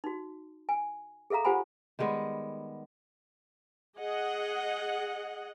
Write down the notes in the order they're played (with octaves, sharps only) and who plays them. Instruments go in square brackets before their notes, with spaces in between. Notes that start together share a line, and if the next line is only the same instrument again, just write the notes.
[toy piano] D#4 F#4
G#5
G#4 A4 E5 F5 A#5
F4 G4 C5 F#5 G#5 B5
[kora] D#3 G3 G#3 B3
[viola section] G#4 D#5 F#5